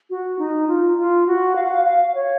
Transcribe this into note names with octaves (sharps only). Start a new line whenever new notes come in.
F#4
D#4
F4
F4
F#4
F5
F#5
F5
F5
C#5